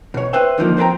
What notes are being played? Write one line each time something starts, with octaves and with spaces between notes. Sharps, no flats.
B2 C#5
B4 C5 E5 G5
C#2 D3 D#3 F3 A3 A#3
F3 C4 B4 G5 A#5